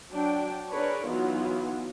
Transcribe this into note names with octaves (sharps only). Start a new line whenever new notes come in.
F#3 D4 G5
D4 G#4 A#4 B4 C#5
E3 F#3 B3 D#4 F4